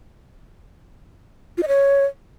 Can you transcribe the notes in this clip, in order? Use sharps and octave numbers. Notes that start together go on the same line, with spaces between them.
F4
D#5
C#5